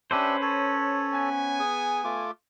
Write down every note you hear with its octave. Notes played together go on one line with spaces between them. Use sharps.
C#4 D4 G4 B4 C5 E5
A4 C#5
B3 G#5
G#4 D#6
A3 F4 D6